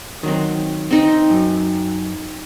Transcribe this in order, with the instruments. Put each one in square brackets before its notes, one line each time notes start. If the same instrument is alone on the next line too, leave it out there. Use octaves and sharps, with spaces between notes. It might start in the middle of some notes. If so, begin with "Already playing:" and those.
[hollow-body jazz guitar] D#3 F#3 C4
[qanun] C4 D#4
[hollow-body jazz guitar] F#2